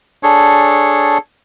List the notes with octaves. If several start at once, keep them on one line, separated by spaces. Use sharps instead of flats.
D4 G#4 A4 C#5